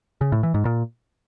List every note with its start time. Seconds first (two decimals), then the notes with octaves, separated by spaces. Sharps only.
0.21 C#3
0.32 A2
0.43 E3
0.54 G#2
0.65 A#2